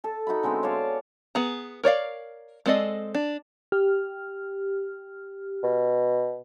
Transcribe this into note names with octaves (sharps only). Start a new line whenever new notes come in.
A4 A5
D#4 F#4 E5 B5
D3 G#3 B3 C4
C#5 D5 F5 A5
B3 G#4 A#5
A#4 C#5 D5 F5
G#3 C4 A4 D5 D#5
D4
G4 F6
B2